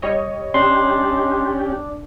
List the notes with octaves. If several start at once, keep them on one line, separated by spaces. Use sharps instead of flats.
G3 C#5 D#5
C#4 D4 G4 C6